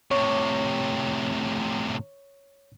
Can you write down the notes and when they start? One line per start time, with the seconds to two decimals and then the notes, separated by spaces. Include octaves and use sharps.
0.11 A2 C3 C#5 C#6